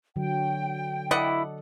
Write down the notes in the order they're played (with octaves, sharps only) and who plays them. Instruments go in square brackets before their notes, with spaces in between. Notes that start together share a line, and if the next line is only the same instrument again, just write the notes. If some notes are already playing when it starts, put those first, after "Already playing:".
[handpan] D3 F#3 [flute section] G5
[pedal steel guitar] E4 [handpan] A4 [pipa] D5 D#5 F#5